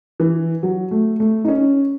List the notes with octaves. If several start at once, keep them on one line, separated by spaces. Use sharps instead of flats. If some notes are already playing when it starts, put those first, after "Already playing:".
E3
F#3
A3
A3
D#4
C#4